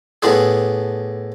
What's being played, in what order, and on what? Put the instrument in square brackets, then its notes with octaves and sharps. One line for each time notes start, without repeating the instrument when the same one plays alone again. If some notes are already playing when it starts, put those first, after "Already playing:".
[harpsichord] A2 B3 D4 G#4